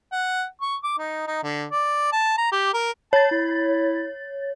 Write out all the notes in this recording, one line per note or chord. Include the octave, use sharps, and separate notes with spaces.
F#5
C#6
D6
D#4
D#4
D3
D5
A5
A#5
G4
A#4
C#5 A5 A6
E4